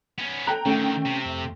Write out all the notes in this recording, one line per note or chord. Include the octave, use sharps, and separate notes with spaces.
B3 C#4
A4 G5 A#5 F#6
D3 D#3 A3 C#4 G5
C3
F2